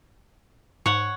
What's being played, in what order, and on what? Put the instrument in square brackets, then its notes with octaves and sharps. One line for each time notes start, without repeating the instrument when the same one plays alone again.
[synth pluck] G#2 [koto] C#5 F#5